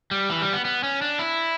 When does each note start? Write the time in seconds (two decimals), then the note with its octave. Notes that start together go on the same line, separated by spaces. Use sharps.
0.11 G3
0.30 E3
0.42 G3
0.53 B3
0.65 B3
0.84 C#4
1.02 D4
1.19 E4